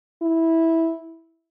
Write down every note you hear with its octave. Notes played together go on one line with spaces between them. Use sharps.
E4